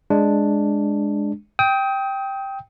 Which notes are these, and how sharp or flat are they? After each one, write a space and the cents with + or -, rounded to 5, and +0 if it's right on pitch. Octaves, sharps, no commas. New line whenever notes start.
G#3 +0 D4 +0
G5 +0 D#6 +35